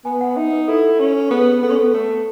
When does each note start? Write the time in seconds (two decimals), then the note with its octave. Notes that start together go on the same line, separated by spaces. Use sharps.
0.05 B3 G#5
0.21 F#5
0.36 D#4 E5
0.53 B4
0.68 E4 A4
0.83 A4
0.99 C#4
1.31 B3 G#4
1.63 B3 A4
1.70 C#4
1.77 B3 A4
1.94 A3